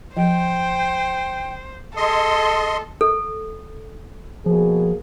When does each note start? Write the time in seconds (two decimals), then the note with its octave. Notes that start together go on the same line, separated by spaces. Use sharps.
0.17 F3 C5 G5
1.96 G#4 A4 D#5 C6
3.01 A4
4.46 B2 F3 A#3 G#4